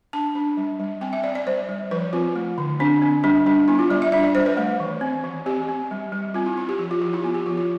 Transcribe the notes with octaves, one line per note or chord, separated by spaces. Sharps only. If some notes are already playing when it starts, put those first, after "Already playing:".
D4 A5
D4
G3
G3
C4 G5
E5
C4 D5
D5
G3 C5
G3
F3 B4
C4 F4
A3
D3
C4 D4
C4
G3 D4
G3 D4
B3 E4
F4
G3 D5
E5
D4 E5
D5
G3 C5
B4
A3
E3
C4
E3
C4 G4
C4
G3
G3
C4 F4
E4
C4 E4
G4
F3 G4
F4
F3 G4
E4
B3 F4
G4
F3 F4
F4